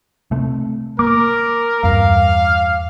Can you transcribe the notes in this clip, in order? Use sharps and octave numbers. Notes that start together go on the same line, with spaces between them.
C3 A3
A#3 A#4 D6
E2 G2 F5